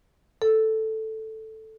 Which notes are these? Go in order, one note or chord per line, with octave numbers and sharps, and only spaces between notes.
A4